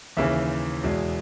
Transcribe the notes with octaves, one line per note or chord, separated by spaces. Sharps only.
D#2 C#3 E3 E5
E2 B2 G#3